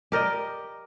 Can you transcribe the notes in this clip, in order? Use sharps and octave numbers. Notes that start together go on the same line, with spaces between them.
G4 A#4 D5 D#5